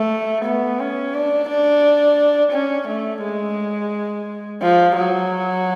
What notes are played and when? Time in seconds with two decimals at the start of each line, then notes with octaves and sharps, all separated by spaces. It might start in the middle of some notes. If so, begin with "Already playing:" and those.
Already playing: A3
0.45 B3
0.79 C#4
1.14 D4
1.49 D4
2.53 C#4
2.88 A3
3.23 G#3
4.62 F3
4.96 F#3